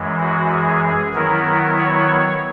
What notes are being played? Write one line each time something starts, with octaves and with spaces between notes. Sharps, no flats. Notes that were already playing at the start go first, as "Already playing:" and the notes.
Already playing: F#2 E3 G#3
F#4
G#4
D#3 F#3 B3 E4 A#4
C#5